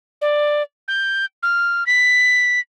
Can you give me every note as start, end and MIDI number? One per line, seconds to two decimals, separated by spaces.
0.21 0.62 74
0.88 1.26 91
1.43 1.86 89
1.86 2.60 95